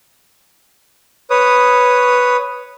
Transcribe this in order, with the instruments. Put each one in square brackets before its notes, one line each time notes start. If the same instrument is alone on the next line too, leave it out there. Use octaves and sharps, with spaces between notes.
[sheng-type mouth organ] B4 C#5 D#6